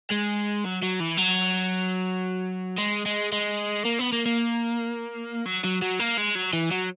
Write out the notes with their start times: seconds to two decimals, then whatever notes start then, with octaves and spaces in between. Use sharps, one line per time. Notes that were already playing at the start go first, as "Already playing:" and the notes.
0.11 G#3
0.64 F#3
0.82 F#3
1.00 E3
1.18 F#3
2.78 G#3
3.06 G#3
3.33 G#3
3.85 A#3
3.99 B3
4.13 A#3
4.26 A#3
5.46 F#3
5.64 F#3
5.82 F#3
6.00 A#3
6.17 G#3
6.35 F#3
6.53 E3
6.71 F#3